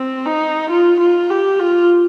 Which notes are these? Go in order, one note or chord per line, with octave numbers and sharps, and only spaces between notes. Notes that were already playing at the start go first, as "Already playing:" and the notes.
Already playing: C4
D#4
F4
F4
G4
F4